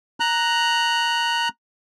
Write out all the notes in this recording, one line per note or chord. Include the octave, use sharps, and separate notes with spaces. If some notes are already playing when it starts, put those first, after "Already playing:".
A#5 F#6